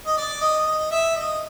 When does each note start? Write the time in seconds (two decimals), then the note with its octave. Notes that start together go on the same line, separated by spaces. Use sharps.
0.06 D#5
0.17 D5
0.41 D#5
0.66 D#5
0.91 E5
1.16 D#5